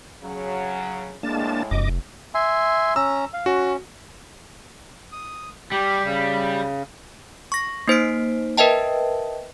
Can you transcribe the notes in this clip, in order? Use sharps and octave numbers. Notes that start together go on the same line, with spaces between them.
C#3 F#3
A2 G#3 A#3 D4 A5
F1 F#2 D#5 D6
E5 G#5 C6
C#4 A#5 E6
F5
C#4 F#4
D#6
G3 G4
C#3
C#6 A#6
A#3 D#4 C5 B6 C7 D7
A#4 B4 D#5 E5 G5 A5